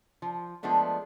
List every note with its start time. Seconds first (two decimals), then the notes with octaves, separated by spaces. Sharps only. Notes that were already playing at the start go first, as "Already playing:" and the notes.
0.22 F3
0.63 F3 G#3 A3 B3 D4